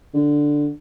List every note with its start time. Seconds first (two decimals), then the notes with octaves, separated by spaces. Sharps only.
0.14 D3